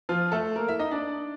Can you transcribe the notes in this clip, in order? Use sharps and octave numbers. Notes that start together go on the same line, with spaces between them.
F3 F4
A3 A4
A#3 A#4
E4 E5
D#4 D#5
D4 D5